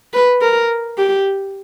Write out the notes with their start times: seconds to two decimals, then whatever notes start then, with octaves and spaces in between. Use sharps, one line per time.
0.13 B4
0.41 A#4
0.98 G4